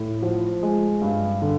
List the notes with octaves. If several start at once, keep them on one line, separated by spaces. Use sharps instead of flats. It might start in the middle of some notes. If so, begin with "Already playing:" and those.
Already playing: A2
F3
G#3
G2
D3